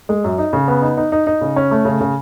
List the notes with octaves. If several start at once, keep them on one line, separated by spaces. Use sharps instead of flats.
G#3
F#2
D#4
C#3
B3
D#4
D#4
D#4
D#4
C#3
C#4
A3
C#3
C#3